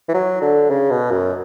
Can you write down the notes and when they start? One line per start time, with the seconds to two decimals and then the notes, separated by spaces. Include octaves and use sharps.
0.09 E3
0.14 F#3
0.42 D3
0.70 C#3
0.91 B2
1.11 F#2